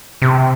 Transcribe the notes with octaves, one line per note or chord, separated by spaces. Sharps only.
C3